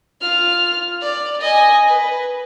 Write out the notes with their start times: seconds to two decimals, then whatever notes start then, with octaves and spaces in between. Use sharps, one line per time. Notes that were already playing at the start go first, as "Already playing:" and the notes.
0.21 F4 F6
1.01 D5
1.41 D#5 G#5
1.88 B4